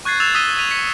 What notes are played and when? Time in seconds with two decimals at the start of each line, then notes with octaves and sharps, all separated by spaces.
0.05 C#6 F#6 G#6 A6 C7
0.20 E6 F#6 G#6 A6 E7 F7
0.34 D#6 E6 B6 D#7 G7
0.59 B6 D#7 F7
0.71 B6 C#7